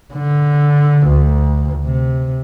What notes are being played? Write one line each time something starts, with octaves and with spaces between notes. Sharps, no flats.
D3
D2
C3